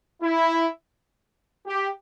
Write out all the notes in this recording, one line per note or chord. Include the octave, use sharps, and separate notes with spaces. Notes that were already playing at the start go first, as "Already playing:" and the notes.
E4
G4